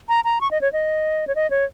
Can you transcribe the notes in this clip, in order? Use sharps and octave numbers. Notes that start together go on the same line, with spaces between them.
A#5
A#5
C#6
D#5
C#5
D#5
C#5
D#5
C#5